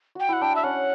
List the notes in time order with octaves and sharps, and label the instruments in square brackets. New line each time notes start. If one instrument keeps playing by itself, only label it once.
[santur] F#4 [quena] G5
[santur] E4 [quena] F#5
[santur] D4 [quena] G5
[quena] E5
[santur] C#4 [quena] F#5